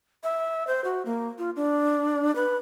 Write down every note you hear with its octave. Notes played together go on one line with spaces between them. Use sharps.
E5
C5
F#4
A#3
F4
D4
B4